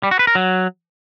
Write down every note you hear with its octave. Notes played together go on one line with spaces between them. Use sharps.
G3
F#4
B4
A#4
F#3